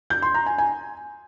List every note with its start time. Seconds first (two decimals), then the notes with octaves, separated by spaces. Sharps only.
0.10 G6
0.22 C6
0.34 A#5
0.46 G#5
0.58 G#5